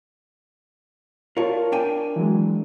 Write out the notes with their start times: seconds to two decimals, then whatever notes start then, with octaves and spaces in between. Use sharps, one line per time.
1.37 F4 A#4 C#5 A5
1.72 D4 G5 G#5
2.16 E3 F#3 G#3